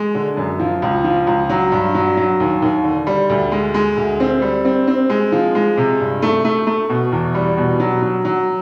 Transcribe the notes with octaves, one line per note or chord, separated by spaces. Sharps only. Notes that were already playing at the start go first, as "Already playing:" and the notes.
Already playing: G#3
D3
F#2
F3
C#2
F3
C#2
F#3
G2
F#3
F#3
D#2
D#2
D3
G3
D2
G#3
G#3
D2
C4
G3
C4
C4
G#3
F3
G#3
C3
G2
A3
A3
A3
B2
E2
G3
B2
F#3
F#3
F#3